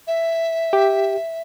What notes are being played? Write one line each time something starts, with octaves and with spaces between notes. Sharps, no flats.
E5
G4